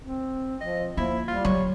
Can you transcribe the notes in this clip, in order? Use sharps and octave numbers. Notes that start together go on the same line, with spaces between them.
C4
F3 D#5
F3 A#3 E4
G3 F4
F#3 C#5